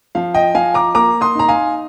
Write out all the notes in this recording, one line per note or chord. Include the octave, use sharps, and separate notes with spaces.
F3 F5
D#5 G5
F3 F5 G#5
A#5 D6
A#3 A#5 D6
C6 D#6
D#4 A#5
F5 G#5